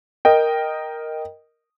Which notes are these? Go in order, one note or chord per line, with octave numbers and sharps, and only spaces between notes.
A#4 D#5 G5